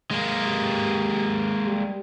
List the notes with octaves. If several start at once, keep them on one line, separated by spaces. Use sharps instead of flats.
G#3 A#3
G4
G3